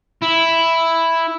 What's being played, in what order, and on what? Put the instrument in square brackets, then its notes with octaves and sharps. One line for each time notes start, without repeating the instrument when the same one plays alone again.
[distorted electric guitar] E4